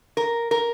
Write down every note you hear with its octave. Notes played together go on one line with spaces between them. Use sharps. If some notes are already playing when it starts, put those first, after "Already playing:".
A#4
A#4